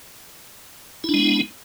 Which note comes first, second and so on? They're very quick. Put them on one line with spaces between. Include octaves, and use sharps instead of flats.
E4 D4 G#3 B3